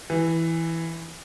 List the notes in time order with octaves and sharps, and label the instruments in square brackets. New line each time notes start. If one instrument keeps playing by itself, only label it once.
[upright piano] E3